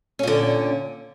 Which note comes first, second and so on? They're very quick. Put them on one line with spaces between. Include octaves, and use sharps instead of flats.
C#4 A#2 D3